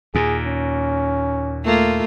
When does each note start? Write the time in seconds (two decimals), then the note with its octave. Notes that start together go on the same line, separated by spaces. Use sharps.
0.15 D#2 A#2 G#4
0.46 C#4
1.64 A3 A#3 F4